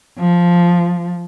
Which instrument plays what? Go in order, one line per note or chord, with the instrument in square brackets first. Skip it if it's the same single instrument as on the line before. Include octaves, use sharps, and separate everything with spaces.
[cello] F3